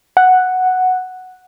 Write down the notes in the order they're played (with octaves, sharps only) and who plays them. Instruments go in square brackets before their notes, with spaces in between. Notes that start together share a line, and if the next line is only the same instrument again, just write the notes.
[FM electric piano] F#5